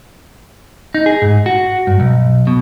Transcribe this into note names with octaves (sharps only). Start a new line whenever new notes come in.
D#4
G#4
G#2
F#4
G2
B1
B2